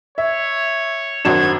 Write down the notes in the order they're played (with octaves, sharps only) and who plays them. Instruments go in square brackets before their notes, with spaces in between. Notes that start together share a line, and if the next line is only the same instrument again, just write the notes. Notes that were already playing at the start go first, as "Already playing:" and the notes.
[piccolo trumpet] C#5 [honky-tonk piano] E5
[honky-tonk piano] G#1 F#2 E7 [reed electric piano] D4 F#4 C5 [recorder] G#6